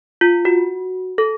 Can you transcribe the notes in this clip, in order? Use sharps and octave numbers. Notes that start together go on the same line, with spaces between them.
F4
F#4
A4